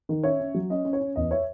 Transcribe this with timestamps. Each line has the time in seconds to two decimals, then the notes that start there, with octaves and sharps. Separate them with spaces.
0.09 D#3
0.24 C#4 C#5 E5
0.40 C#4
0.54 F#3
0.70 C#4 D#5
0.85 C#4
0.93 C#5
1.01 C#4
1.16 E2 D#5
1.31 C#5 E5